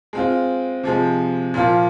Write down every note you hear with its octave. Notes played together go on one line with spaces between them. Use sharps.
G#3 C4 F4
C3 F3 G#3
A#2 F3 A#3 F4